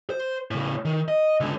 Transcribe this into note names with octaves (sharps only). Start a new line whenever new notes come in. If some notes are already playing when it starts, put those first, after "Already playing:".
C5
A2 C#3
D#3
D#5
C#2 D3